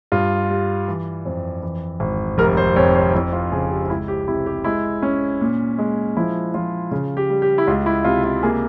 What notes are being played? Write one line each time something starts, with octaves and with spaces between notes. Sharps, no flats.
G2 F4
G3
E3
F2
E3
G#1
F1 A#4
C5
F2 C#5
C5
F2 E4
F4
C#3 G#4
G4
F4
C#2 E4
G4
C3 E4
G4
G#3 E4
C#4
A#2
G#3
F3 E4
F3 F4
C#3 F4
G4
G3
G4
E4
C#2 F4
E4
C3 F4
F4
A#3 G#4